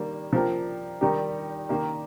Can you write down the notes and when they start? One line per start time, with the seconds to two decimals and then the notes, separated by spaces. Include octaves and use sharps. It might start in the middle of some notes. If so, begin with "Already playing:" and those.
Already playing: D#3 G3 A#3
0.33 F3 A#3 G4 A#4
1.01 D#3 G3 D#4 G4
1.69 D#3 A#3 G4 A#4